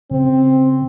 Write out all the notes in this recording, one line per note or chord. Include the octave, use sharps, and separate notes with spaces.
C#3 C4